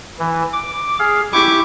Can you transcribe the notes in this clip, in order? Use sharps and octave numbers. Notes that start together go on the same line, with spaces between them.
E3
D6
G#4 F5
E4 G4 C#6 D6